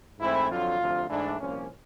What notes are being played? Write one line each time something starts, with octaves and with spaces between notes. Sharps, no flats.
G#2 E3 A3 C4 E4
F2 D3 F#3 F4
D2 C3 F3
G#2 E3 A3 D4
C2 A#2 F3 A#3 C#4